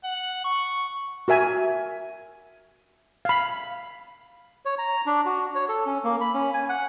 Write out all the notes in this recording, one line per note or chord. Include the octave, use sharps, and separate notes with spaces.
F#5
C#6
F#4 A#4 E5 G#5
F5 B5
C#5
A#5
D4
F#4
C#5
A4
C#4
A#3
B5
C#4
G#5
F#5